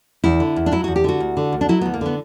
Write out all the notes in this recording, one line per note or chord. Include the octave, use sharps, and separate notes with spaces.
E2 E4
D3
E2
D4
F#3 E4
E2 F#4
G4
D3 F#4
D2
D3
D2
D4
F#3 E4
D2 B3
A#3
D3 B3